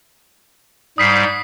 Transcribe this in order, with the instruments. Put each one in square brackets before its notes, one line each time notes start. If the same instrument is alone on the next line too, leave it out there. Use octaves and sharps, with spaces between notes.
[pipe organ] G#2 G3 [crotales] D#6 B6 C7